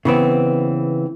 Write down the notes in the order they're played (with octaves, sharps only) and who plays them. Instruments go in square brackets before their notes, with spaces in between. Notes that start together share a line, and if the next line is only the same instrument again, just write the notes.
[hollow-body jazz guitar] C#3 B3 C4 [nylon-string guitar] E3